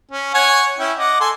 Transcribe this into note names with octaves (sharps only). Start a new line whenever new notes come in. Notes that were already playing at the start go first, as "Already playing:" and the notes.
C#4
C#5 F#5 G#5
C#4 E4 G5
D#5 F#5 D6
A4 G#5 C6